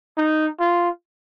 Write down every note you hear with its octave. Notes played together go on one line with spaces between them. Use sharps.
D#4
F4